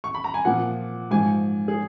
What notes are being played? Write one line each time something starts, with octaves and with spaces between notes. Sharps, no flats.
C#6
B5
A#5
G#5
A#2 F3 F#5
G#2 F3 G#5
G#4